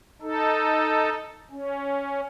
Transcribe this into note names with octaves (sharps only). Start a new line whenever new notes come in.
D#4 A4
C#4